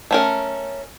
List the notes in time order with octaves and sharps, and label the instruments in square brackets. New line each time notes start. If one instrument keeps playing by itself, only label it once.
[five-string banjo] A3 C#4 A#4